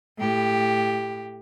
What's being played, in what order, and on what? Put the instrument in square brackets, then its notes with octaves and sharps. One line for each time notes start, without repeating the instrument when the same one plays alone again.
[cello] A2 G4